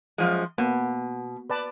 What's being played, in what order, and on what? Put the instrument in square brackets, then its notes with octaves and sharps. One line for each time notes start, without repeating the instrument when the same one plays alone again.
[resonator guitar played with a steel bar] F#2 F3 G#3
[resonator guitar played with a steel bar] B2 [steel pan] A#3 B3
[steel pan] B4 D5 A5